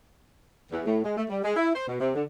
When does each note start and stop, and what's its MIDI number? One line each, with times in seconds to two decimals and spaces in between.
0.72 0.83 40
0.86 1.00 45
1.04 1.14 56
1.17 1.25 57
1.29 1.40 55
1.44 1.53 56
1.56 1.72 64
1.75 1.86 72
1.88 1.99 47
2.01 2.14 48
2.14 2.23 50